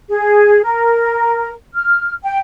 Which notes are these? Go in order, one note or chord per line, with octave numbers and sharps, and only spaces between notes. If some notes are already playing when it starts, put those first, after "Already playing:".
G#4
A#4
F6
G5